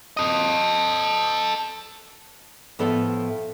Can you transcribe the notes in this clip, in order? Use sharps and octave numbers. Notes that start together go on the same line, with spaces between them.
A4 D#5
A2 F3 B3 A4 E5